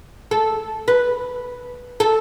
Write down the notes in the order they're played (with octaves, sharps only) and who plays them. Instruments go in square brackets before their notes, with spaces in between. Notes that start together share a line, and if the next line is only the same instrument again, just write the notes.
[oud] A4
B4
A4